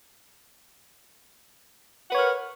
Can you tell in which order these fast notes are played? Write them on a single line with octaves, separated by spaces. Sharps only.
F#5 B4 C#5 A#4